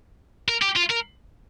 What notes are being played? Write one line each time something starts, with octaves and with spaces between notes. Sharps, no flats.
A#4
G4
F4
A#4